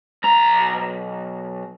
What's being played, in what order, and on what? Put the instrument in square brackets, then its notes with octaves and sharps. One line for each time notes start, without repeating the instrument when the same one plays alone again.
[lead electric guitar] B1 A#5